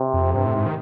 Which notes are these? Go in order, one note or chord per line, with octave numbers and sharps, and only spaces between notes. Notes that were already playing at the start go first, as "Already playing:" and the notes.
Already playing: C3
F2
G2 C3
A2
G#2
D#3